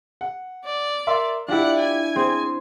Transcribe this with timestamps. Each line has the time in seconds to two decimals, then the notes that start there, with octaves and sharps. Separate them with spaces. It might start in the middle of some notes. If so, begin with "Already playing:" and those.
0.21 F#5
0.65 D5
1.07 A#4 E5 C6
1.48 D4 E4 F4 G4 D5 F#5
1.78 G#5
2.16 C4 G#4